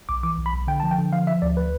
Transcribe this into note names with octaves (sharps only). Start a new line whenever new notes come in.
B1 D6
E3 D6
B1
B5
B1
D3 G5
F3 A5
G5
D3
F3 F5
F3 E5
D2 D5
B4